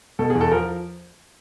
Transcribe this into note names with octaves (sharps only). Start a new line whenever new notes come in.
B2 A4
G#4
E2
A4
F3 A#4